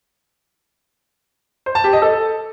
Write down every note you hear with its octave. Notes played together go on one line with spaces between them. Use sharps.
C5
A5
G4
D#5
A4